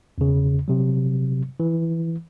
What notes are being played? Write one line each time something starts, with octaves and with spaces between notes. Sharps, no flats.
E2 C#3
C3 F#3
E3